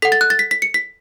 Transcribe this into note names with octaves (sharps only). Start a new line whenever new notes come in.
A4 F#5 B6
A6
F#6
A6
B6
B6
C#7
B6